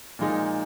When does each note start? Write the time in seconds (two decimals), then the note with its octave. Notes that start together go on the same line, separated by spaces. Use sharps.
0.19 A#2 F3 G#3 D#4